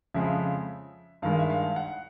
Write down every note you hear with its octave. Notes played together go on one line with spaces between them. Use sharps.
F2 C#3 F3 G#3 E5
G2 D#3 G#3 F5
E5
F5
F#5